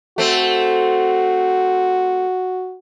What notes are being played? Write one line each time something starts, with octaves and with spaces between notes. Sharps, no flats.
A3 C4 F#4